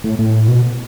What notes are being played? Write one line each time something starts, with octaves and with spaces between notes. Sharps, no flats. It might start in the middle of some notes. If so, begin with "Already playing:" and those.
A2
A2
B2